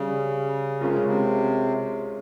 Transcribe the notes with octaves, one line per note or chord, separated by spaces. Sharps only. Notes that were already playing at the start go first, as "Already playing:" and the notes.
Already playing: C#3 G3
C3 G#3 C#4 F4 A#4
C#3
C3